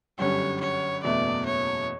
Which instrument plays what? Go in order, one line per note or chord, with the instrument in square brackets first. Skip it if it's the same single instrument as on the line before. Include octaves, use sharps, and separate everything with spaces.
[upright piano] G1 F#2 D3 G3 C#4 [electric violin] C#5
[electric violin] C#5
[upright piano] F#1 E2 B2 A3 [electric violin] D5
[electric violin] C#5